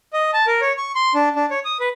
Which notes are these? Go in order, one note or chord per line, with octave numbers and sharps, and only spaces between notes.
D#5
A5
A#4
C#5
C#6
C6
D4
D4
C#5
D#6
B4